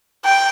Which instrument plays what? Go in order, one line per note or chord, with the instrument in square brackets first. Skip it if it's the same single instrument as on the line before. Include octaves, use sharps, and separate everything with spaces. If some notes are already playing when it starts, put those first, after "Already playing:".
[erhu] G5